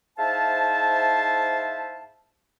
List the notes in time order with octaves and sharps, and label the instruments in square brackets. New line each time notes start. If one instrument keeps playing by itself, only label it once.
[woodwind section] G#2 E4 C5 E5 F5 A5